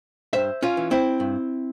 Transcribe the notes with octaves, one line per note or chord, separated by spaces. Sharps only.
G2 C5 E5
C#4 F4
E3
C4 E4
G2